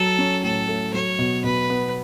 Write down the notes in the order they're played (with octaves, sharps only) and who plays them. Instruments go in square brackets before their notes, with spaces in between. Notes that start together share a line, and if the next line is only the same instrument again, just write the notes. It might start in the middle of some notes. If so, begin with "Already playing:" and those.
Already playing: [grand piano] F#3 [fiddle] A4
[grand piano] C#4
[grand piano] A2 [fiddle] A4
[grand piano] A3
[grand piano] F#3 [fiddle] C#5
[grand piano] B2
[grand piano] B2 [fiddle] B4
[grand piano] B3